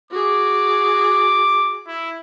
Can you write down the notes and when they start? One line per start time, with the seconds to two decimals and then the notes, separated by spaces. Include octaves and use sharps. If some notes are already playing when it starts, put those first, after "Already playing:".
0.11 F#4 G#4 D6
1.87 E4